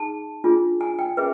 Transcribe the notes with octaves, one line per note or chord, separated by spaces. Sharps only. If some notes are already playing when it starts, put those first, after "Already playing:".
Already playing: D#4 G#4 A5
D4 F4 G#4
G#5
G5
C#4 G#4 B4 E5